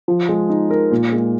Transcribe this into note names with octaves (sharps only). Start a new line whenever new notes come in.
F3
G#3
D#4
A#4
A#2
G#3